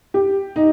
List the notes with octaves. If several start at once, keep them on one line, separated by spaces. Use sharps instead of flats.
G4
D#4